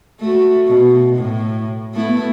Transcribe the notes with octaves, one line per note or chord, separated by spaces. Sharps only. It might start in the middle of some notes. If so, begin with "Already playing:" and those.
A3 F#4
B2
A2
A3 B3 E4